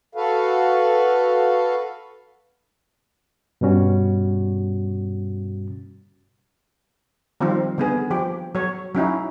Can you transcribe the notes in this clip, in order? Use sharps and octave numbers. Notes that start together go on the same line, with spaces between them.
F#4 A4 B4 F5
G2 B2 G3 C#4 F#4
D#3 F3 G3 C4 F4
D3 B3 G#4
F3 G4
F#3 C#5
F#3 C#4 D#4 E4